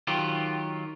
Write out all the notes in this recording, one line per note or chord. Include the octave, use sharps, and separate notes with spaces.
D#3 F#3 F4 G4